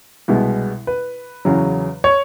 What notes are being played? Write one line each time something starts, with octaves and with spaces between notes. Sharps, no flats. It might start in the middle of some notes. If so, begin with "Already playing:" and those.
C2 B2 G#3 B3
B4
E2 C#3 F#3
C#5